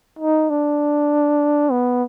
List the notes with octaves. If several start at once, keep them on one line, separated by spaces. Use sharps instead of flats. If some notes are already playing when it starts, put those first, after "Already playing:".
D#4
D4
B3